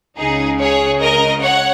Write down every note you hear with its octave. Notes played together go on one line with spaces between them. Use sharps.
C#2 C#3 D#4 G#4
G#4 C#5
A#4 D#5
C#5 F#5